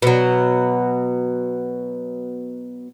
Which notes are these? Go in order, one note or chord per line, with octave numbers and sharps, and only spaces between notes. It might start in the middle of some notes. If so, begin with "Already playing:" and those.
B2 F#3